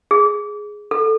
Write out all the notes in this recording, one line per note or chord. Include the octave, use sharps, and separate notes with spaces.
G#4
A4